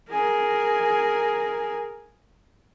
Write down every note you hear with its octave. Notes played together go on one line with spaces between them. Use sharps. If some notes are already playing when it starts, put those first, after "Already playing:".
G#4 A#4